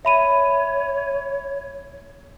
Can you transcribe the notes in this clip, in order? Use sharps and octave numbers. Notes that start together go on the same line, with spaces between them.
C#5 E5 B5 D#7